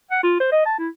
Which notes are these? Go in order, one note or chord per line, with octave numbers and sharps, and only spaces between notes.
F#5
F4
C5
D#5
A5
E4